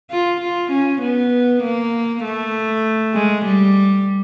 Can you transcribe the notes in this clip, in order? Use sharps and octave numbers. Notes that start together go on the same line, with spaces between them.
F4
F4
C#4
B3
A#3
A3
G#3
G3